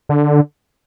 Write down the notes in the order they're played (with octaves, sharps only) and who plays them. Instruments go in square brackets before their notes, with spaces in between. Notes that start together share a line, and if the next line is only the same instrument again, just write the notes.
[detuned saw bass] D3